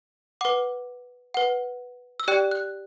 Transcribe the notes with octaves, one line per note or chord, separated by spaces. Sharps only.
B4 F#5 D6
B4 F#5
E6
G4 D5 G5 F#6
F#6